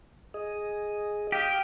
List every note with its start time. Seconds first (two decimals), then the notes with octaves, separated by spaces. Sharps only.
0.34 G#4 D#5
1.32 G4 F5 D#6 G6